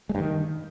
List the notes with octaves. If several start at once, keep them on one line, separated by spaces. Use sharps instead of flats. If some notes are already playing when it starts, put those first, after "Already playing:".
G#3
G2
D#3